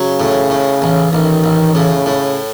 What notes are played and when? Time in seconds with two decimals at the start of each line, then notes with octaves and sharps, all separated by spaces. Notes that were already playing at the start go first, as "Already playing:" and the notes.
Already playing: C#3 F#3
0.20 A2
0.50 A2
0.82 A1
1.12 A1 D#3
1.44 A1
1.75 A2 C#3
2.06 A2